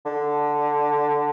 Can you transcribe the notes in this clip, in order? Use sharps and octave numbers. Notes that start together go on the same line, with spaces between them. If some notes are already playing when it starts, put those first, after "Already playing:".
D3